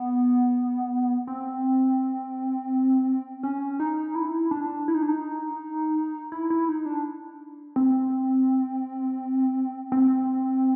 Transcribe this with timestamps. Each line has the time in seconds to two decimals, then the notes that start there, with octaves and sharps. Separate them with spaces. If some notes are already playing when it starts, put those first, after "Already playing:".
Already playing: B3
1.27 C4
3.43 C#4
3.80 D#4
4.15 E4
4.51 D4
4.88 E4
4.94 D#4
5.02 D4
5.08 D#4
6.32 E4
6.50 E4
6.69 D#4
6.86 D4
7.76 C4
9.92 C4